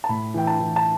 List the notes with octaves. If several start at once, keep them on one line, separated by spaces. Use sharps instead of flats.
A5
A2 B5
E3 G5
A5
E3
A5